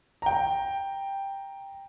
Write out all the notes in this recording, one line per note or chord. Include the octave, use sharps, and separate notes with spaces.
G5 A#5